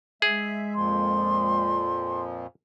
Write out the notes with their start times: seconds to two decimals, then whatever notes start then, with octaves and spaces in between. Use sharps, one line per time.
0.22 G#3 G#4 E5
0.75 F2 A#2 F3 C6